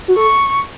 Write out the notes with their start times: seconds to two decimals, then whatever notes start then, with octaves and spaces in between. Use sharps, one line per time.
0.08 F#4
0.16 A4 C#6